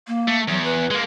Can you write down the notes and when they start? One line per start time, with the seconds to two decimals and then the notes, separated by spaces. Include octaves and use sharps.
0.07 A#3
0.28 A3
0.48 E2 F#3
0.64 B4
0.91 G#3 A#3